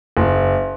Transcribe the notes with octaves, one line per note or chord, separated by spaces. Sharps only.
F#1